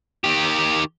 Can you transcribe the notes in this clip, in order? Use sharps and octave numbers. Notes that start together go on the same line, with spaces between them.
D#3 G4